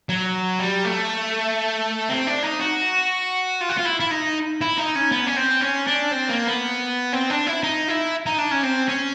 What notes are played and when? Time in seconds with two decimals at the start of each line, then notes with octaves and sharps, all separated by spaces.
0.09 F#3
0.59 G3
0.84 A3
2.09 C4
2.27 D4
2.43 D#4
2.60 F#4
3.61 F4
3.70 F#4
3.78 F4
3.86 E4
4.00 E4
4.11 D#4
4.61 E4
4.78 D#4
4.95 C#4
5.12 B3
5.27 C#4
5.37 C4
5.61 C#4
5.87 D4
6.12 C4
6.29 A#3
6.46 B3
7.13 C4
7.30 D4
7.47 E4
7.63 D#4
7.88 E4
8.26 D#4
8.38 D4
8.51 C#4
8.63 C4
8.89 C#4